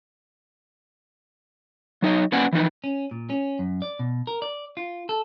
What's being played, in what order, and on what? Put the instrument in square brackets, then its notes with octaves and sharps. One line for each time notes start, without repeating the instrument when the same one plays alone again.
[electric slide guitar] F#3 D#4 C#5 D#5
A#3 C#4 B4 D5 F#5 G#5
E3 F3 D#4 B4
[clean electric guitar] C#4
A#2
C#4
F#2
D5
B2
A#4
D5
F4
A4